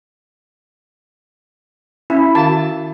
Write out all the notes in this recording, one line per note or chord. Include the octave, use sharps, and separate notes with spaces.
C#4 E4
D#3 F#4 F5 A5